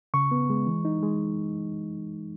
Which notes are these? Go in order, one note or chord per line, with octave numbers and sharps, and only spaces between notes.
C#3 C#6
B3
G#3
E3
D#4
G#3